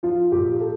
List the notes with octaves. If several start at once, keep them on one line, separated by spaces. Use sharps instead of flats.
F3 F4
A#2 G4
A4